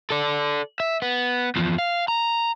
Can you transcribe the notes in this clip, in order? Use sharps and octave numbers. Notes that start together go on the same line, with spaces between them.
A4 D5
E5
B3
E2 F3
F5
A#5